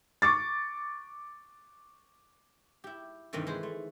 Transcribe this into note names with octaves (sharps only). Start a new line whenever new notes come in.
C#6 D6 A6
E4 G4
G2 C3 D#3 E3 A3
G#3 B4 C5
A3